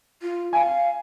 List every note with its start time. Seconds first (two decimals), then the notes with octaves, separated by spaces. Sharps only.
0.22 F4
0.53 F5 G#5